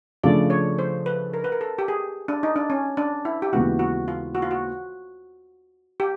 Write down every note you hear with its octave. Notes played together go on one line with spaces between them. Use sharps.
C#3 F3 A3 D4 D5
C#5
C5
B4
A#4
B4
A#4
A4
G4
G#4
D4
D#4
D4
C#4
D4
E4
G4
D#2 C#3 E3 G#3 B3 F#4
F#4
F4
F#4
F4
F#4
G4